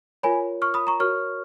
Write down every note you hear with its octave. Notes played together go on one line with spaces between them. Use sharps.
F4 A#4 C#5 G#5 B5
C#6 F6
B5 D#6
A#5 C#6
F#4 A#4 C#5 C#6 F6